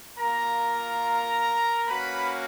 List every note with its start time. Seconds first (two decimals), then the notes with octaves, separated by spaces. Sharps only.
0.19 A#3 F4 A#4 A#5
1.88 A#3 C#4 F#4 B4 B5